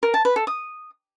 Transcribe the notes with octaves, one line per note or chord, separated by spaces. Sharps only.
A#4
A5
B4
A4
D#6